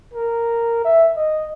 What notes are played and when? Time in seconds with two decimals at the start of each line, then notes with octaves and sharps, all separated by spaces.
0.13 A#4
0.84 E5
1.16 D#5